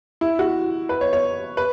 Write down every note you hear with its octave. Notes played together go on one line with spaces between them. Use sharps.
E4
F#4
B4
C#5
C#5
B4